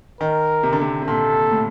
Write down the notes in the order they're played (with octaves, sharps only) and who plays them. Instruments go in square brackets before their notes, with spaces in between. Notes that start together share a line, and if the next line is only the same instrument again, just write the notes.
[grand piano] D#3 [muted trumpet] A#4
[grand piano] C3
D3
C3
C3
[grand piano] A#2 [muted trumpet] A4
[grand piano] A2